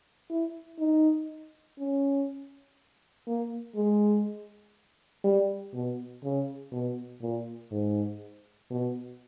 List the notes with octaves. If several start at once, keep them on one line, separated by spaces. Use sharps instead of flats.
E4
D#4
C#4
A#3
G#3
G3
B2
C#3
B2
A#2
G#2
B2